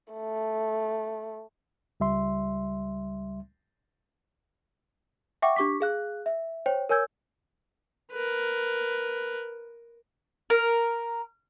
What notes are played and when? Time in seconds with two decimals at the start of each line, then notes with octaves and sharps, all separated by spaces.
0.14 A3
2.00 C#2 G3 E5 C6
5.42 E5 F#5 G5 C#6 D6
5.56 D4 G4 C#6 D6 B6
5.81 G#4 F5 F#6
6.26 E5
6.66 C5 C#5 G5
6.89 A#4 C#5 G#5 E6 G6 G#6
8.12 A#4 B4
10.50 A#4